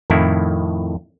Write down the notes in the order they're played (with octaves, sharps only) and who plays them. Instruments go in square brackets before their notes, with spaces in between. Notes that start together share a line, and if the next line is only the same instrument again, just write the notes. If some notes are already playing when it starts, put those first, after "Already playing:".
[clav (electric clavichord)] F2 A2 D#3 E4